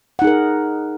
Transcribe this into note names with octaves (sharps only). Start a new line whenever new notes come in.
D#4 G#4 A#4 F#5